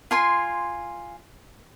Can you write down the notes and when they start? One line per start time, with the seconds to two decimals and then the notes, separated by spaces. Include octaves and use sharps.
0.11 F4 G#5 C6